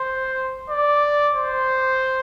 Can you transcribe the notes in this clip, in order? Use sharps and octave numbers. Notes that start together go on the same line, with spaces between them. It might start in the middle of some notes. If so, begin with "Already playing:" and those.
Already playing: C5
D5
C5